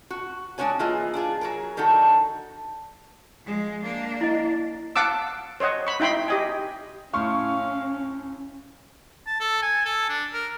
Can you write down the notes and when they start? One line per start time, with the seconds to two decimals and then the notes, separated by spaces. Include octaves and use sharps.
0.11 F#4
0.58 G#3 D4 F#4 C#5 G#5
0.79 E3 A#3 F4 G#4 D#5
1.14 D4 F4 G#4
1.41 F#3 G#4 A#4
1.77 D#3 D4 D#4 F#4 A4
3.44 F3 G#3
3.82 A#3 D4
4.21 E4 D#5
4.96 F5 F#5 A5 D6 E6
5.60 C5 C#5 D#5 F#5
5.87 B5 C#6
6.00 D#4 E4 G5 B5 C6
6.28 G4 D#5 G#5
7.14 A2 C#4 F5 C6 C#6 F6
9.27 A5
9.40 A4
9.62 G#5
9.85 A4
10.09 D4
10.33 A#4